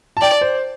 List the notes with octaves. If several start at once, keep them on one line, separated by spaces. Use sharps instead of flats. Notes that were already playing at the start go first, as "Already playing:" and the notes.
A5
D5 G5
C5